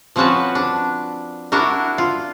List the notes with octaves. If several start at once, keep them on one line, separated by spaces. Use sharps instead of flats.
F3 C4 C#4 F#4 B4 A5
D4
D4 E4 F#4 A#4
F4